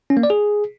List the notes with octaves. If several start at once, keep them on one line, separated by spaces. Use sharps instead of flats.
C#4
A#3
D5
G#4